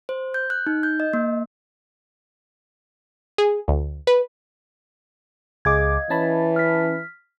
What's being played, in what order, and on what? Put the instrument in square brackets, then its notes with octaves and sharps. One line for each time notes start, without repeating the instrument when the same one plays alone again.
[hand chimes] C5
G6
F#6
D#4
G6
D#5
A#3
[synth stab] G#4
D2
B4
[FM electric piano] C#2 G#4 D6 [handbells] D#5 F5 G#6
[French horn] E3 [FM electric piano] C#4 A5 B5
[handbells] F6 B6